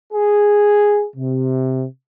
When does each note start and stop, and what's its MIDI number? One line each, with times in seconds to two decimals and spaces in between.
0.13 1.05 68
1.16 1.84 48